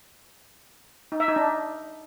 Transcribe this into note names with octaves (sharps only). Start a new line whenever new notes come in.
D#4
E5
D#4
D4